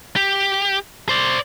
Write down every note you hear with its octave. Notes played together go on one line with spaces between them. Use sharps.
G4
C5 D5